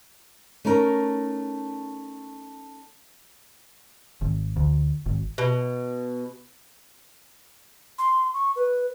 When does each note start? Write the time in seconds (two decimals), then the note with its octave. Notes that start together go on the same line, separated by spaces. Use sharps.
0.65 A3 C#4 D#4 A#4
4.21 G#1
4.56 D2
5.06 G#1
5.38 B2
7.98 C6
8.34 C#6
8.56 B4